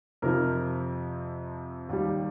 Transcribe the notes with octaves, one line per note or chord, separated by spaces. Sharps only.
F2 C3 F3 A#4
D#2 D#3 G3